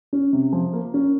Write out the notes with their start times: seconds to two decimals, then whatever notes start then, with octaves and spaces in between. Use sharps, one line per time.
0.13 C#4
0.33 C3
0.53 F3
0.73 A#3
0.94 C#4